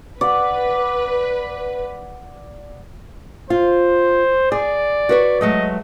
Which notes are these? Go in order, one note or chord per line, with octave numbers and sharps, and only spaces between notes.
B4 D5 F#5
F4 C5
G#4 D5
F#4 B4 C#5
F#3 G#3 A3 D#5